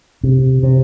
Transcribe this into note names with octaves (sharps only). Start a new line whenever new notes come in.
C3
C3